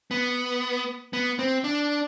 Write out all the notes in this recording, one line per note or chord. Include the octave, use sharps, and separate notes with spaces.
B3
B3
C4
D4